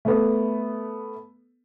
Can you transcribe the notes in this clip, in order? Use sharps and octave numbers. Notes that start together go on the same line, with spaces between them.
A3 B3